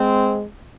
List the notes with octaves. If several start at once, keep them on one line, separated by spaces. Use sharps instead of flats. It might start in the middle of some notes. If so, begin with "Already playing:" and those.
Already playing: G#3 C4